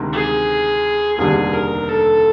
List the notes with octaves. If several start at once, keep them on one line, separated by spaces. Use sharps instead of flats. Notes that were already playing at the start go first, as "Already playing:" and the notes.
Already playing: D2 C3 D#3 G#3
G#4
F1 D#2 D3 G3 G#4
A#4
A4